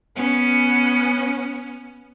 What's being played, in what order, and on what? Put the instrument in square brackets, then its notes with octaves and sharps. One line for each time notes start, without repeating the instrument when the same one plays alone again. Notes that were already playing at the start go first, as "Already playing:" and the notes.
[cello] B3 C#4